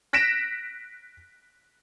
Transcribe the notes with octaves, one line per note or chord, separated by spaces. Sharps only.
F#6 A#6 B6 D7 E7